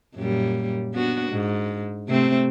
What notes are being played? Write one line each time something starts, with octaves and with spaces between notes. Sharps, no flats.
F#2 A#2 G3
B3 D4 F#4
G#2
C3 A3 C4